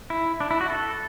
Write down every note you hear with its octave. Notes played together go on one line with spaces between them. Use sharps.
E4
D4
E4
F#4
A4